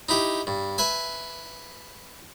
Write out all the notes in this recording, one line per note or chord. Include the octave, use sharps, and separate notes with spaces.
D#4 E4 G4
G2
B4 E5 G#5